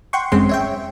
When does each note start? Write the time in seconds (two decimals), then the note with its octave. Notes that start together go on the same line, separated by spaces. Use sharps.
0.13 F#5 G5 C6 C#6
0.32 G#1 F#2 G#3 C4 C#4 C6
0.49 C#5 E5 G5